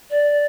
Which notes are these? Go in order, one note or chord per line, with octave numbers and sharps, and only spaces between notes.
D5